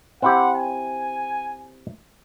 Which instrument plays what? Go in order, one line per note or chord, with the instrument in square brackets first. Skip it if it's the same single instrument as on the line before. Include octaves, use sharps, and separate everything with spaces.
[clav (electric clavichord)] C4 E4 G4 [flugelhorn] F#5
[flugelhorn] G#5